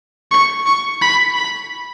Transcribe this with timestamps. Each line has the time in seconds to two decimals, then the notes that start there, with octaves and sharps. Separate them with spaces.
0.31 C#6
0.66 C#6
1.01 B5
1.36 B5